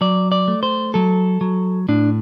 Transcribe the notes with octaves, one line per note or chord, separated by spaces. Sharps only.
F#3 D5
D5
A3
C5
F#3 A4
F#3
A2 D4